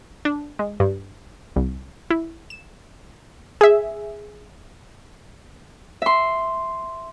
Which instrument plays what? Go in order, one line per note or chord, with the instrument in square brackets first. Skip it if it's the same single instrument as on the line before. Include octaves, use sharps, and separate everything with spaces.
[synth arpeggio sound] D4
G#3
G2
C2
E4
E7
G#4 E5
[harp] E5 C6